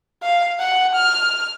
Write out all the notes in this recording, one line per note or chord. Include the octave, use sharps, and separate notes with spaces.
F5
F#5
F6